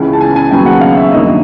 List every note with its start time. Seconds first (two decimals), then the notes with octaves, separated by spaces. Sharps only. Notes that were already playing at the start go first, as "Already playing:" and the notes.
Already playing: C#2 C#3 E3
0.13 A5
0.21 G#5
0.36 G#5
0.51 D#2 C#3 F#3 B3 G5
0.66 F#5
0.81 F5
0.97 E5
1.12 G2 D#3 F#3 A#3 D#5